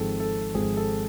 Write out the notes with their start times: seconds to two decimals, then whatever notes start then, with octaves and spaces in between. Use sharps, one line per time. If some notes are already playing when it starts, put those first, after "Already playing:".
Already playing: G#1 G#2 F3 G#3 C4 A4
0.20 A4
0.54 G#1 G#2 F3 G#3 C4 G#4
0.77 A4